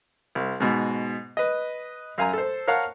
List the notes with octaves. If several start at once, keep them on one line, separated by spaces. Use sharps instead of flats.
C2
G#2 B2
B4 D#5
F#2 F5 G#5 A#5
A4 C5
A#4 C#5 F5 F#5 A5